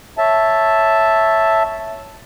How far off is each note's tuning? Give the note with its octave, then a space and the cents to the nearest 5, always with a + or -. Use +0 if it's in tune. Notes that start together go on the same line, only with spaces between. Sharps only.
C#5 +0 E5 +0 A5 +0